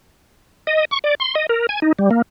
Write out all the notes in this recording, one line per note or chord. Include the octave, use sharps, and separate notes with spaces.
D#5
C#6
D5
C6
D#5
A#4
G#5
D#4
G3
A#3